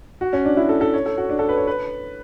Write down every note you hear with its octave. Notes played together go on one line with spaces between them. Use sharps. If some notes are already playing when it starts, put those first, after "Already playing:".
F#4
C#4
D4
E4
A4
A4
C#5
A4
F#4
D4
A4
B4
C#5
B4